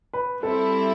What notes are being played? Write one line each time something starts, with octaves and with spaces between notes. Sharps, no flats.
B4
G3 C4 E4 A4